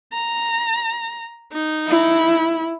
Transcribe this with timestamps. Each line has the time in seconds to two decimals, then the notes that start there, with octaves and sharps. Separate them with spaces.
0.13 A#5
1.53 D#4
1.88 E4